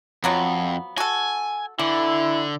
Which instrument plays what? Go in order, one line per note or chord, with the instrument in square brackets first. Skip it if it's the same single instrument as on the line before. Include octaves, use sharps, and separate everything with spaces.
[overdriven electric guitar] F2 [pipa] F3 F#3 B3
[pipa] F#4 A4 [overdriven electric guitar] G#5
[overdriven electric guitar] D3 [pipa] E3 [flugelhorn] E4